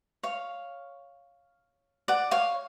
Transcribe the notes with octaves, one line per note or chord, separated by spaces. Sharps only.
C#5 F5
D5 F#5
C#5 F5